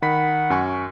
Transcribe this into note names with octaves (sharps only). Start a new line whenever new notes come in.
D#3 F#5 B5 B6
F#2 G#5 C#6